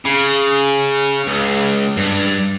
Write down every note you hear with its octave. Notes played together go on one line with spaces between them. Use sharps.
C#3
C#2
G2